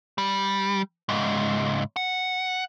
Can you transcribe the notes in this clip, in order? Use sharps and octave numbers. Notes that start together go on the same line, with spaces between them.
G3
C#2 G#2
F#5